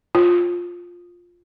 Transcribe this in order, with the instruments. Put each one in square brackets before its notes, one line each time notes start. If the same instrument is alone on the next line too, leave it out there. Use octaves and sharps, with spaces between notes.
[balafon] F4